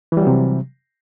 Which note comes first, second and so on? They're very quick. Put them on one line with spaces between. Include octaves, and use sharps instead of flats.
E3 G3 F#3 C3